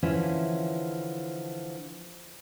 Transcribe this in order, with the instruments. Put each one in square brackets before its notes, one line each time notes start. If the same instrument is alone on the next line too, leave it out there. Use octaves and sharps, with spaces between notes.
[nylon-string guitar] D3 E3 F3 C#4 D4 E4